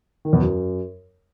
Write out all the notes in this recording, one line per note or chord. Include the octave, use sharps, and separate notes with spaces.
D#3
E2
F#2